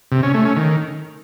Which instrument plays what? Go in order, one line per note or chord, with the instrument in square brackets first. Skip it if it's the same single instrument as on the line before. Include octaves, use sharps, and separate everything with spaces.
[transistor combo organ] C3
C#4
A3
C#4
D#3